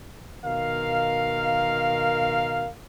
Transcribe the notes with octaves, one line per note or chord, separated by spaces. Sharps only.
B2 D#3 A#4 F5